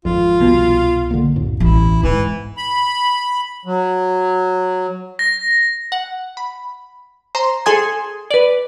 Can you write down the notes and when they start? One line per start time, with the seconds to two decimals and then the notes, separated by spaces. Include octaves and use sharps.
0.05 G#1 F2 F4
0.40 C2 B2
1.11 D3 A#3
1.36 F#2 A2
1.60 A1 E4
2.03 G#2 E3
2.57 B5
3.65 F#3
5.19 A#6
5.92 F#5
6.37 B5
7.35 C5 A#5 C6
7.66 G#4 A4 G#5 C6 D#6 G#6
8.31 B4 D5